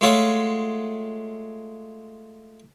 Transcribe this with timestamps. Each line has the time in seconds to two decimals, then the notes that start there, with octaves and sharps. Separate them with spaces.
0.01 G#3 A3 F4 C#5 E5 F#5